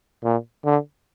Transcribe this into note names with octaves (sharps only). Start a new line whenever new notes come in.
A#2
D3